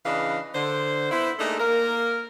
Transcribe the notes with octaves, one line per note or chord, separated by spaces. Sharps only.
C#3 E3 D4 B4 D#5 F5
D3 C5
B3 E4 C5
A3 A#3 D4 D#4 G#4 A4
A#3 A#4